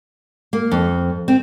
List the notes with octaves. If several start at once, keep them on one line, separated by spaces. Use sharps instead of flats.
A#3
F2
C4